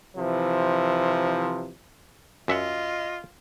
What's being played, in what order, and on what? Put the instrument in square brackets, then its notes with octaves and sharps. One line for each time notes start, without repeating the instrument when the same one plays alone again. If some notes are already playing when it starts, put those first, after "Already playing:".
[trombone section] C3 E3 F3
[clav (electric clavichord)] F#2 E5 F#5 [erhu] F4 [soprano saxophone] D#5